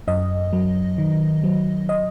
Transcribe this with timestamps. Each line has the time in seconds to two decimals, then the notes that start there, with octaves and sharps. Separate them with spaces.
0.08 F#2 D#5
0.53 F#3
0.98 D#3
1.44 F#3
1.89 D#5